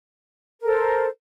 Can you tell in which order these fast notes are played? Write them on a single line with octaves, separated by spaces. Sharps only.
A#4 A4 C5